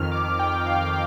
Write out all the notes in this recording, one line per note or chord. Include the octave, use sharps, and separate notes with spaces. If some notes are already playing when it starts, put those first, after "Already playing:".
Already playing: F2 D#3 F6
D6
G5
F5